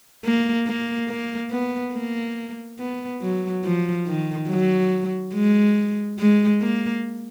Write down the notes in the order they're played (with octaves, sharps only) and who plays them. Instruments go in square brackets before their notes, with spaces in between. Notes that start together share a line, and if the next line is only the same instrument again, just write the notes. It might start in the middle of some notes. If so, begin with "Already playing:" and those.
[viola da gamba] A#3
A#3
A#3
B3
A#3
B3
F#3
F3
D#3
F#3
G#3
G#3
A#3